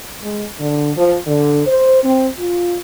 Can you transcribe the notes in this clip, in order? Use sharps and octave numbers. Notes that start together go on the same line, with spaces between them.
G#3
D3
F3
D3
C5
C4
F4